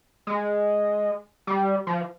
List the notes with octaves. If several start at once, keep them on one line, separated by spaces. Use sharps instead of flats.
G#3
G3
F3